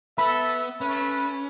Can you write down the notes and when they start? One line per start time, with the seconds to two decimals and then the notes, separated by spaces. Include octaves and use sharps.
0.18 B3 A4 B4 E5 B5
0.81 A3 C#4 B4